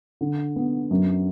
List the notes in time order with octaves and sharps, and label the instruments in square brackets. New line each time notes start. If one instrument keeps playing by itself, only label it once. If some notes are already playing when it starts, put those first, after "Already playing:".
[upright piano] D3
B3
F#2